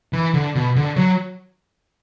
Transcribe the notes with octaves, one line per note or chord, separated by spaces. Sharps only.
E3
D3
B2
D3
F#3